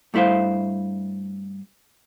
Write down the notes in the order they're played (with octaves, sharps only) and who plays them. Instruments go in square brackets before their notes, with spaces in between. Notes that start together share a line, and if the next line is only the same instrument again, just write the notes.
[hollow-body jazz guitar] G2 A3 E4 C5 F5